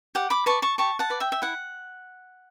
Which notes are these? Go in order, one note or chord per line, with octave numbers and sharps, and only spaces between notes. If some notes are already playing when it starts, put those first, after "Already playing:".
G4 F#5
B5 D6
B4 D5 A5 C#6
A5 C#6
G4 A5 C#6
F#5 A5
B4 D5
E5 G5
E5
E4 F#5